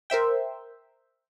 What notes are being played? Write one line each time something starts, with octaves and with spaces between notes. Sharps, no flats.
A#4 C5 E5 G5